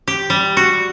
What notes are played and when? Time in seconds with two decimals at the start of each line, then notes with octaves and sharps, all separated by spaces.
0.08 G4
0.30 G3
0.57 F#4